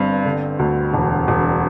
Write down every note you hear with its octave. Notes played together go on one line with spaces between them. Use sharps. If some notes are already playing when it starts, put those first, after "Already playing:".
Already playing: G1 G2 C4
D3
D2
E1
E1